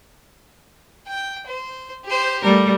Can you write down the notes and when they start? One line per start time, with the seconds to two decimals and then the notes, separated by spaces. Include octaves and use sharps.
1.07 G5
1.46 C5
2.05 G4 C5
2.43 G3 A3 A#4